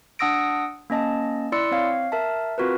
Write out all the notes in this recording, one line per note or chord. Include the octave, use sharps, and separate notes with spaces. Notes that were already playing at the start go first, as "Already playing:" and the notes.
D4 F#5 D#6 E6 A#6 D7
A#3 C#4 D#5 A5
E4 D5 C6 E6 C#7
C4 C#5 F5
A#4 E5 A5
C4 F4 F#4 A#4 B4